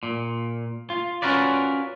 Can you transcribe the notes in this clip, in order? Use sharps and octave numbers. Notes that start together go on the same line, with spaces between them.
A#2
F4
C#4 F4 F#4 A#4 B4 D5